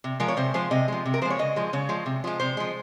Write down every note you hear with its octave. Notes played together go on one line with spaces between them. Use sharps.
C3
F3 G#3 A#4
C#5
C3 C5
F3 G#3 C5
C3 D#5
F3 G#3
C3
A#4
F3 G#3 C5
C#5
C#3 D#5
F3 G#3
C#3 C#5
F3 G#3
C3
F3 G#3
C3 C5
F3 G#3